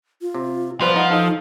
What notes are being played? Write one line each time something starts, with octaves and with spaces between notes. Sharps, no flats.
F4
C3
F3 G3 B3 B4 C5
D#4 F#5
D#4 A4 D#5